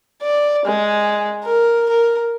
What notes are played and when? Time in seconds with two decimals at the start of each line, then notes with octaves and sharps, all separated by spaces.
0.23 D5
0.65 G#3
1.44 A#4
1.89 A#4